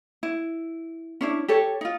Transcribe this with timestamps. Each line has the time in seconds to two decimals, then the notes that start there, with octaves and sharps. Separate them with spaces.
0.23 E4
1.21 C#4 D4 E4
1.48 G4 A4 C#5
1.81 D#4 F4